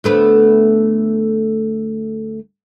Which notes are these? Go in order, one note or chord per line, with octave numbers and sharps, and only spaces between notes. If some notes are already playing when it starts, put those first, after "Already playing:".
D2 A3 B3